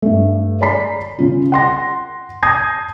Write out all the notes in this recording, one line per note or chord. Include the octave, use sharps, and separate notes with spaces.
G2 A3
C#5 D5 A#5 B5 B6 C7
C#3 F4
F#5 C6 A#6
A5 D#6 G6 G#6 A#6 C7